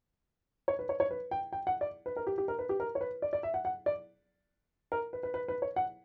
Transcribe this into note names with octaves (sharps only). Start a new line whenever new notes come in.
C#5
B4
C#5
C#5
B4
G5
G5
F#5
D5
B4
A#4
G4
G4
A#4
B4
G4
A#4
C#5
B4
D5
D5
E5
F#5
F#5
D5
A#4
B4
B4
B4
B4
C#5
F#5